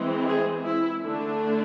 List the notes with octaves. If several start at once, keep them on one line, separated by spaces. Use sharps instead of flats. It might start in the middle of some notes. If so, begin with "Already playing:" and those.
Already playing: E3 G#3 C4
G#4
E4
D3 A3 D4